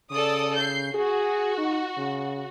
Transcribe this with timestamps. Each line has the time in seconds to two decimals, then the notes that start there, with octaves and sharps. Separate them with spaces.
0.11 C#3 A4 D5 D#6
0.55 G6 C7
0.94 F#4 G#4
1.58 D#4
1.97 C#3